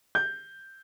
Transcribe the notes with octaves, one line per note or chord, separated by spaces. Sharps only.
G6